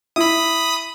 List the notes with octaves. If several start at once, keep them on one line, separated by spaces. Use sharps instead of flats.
E4 B5 D#6